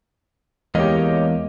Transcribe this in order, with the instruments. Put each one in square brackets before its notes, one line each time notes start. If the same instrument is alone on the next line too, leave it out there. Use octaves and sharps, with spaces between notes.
[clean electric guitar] E2 A#3 [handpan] G#3 [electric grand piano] G4 C#5 D#5